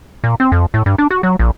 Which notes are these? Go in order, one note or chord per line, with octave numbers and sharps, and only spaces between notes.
A#2
C4
F2
A2
G2
D4
F#4
F#3
A#1